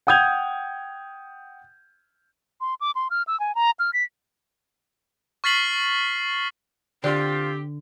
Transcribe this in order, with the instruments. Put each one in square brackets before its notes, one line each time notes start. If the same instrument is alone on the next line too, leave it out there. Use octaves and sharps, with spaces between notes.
[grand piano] F#5 G5 D#6 G6 G#6 F7
[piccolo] C6
D6
C6
F6
E6
G#5
A#5
F6
B6
[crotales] C#6 F6 A6 B6 C7 F#7
[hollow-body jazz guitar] D3 [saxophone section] C4 G4 [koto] D4 [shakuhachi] F4